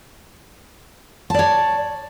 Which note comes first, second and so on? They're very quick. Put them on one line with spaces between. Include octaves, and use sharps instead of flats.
A5 D5 C#5